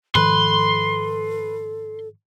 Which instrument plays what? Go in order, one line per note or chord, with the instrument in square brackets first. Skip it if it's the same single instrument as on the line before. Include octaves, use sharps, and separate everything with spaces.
[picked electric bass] G#2 D#3 F3 [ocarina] A4 [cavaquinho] B4 [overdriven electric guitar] C6